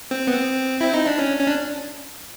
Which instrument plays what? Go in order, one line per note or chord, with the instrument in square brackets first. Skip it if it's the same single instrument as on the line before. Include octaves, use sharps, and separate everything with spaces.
[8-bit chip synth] C4
B3
C4
E4
D#4
D4
C#4
C#4
D4